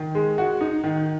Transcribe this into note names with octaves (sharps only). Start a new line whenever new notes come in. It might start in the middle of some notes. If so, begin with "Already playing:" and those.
Already playing: D#3
G#3
F#4
D#4
D#3